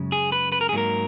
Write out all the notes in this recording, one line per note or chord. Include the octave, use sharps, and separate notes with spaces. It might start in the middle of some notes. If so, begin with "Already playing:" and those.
Already playing: F#2 C#3 G#3
G#4
B4
B4
A#4
G#4
G#2 F#3 A#3 A#4